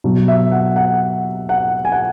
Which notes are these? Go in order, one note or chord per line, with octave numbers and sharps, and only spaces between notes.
B2 F#3
E5
F#5
F#5
F#5
G#5
F#5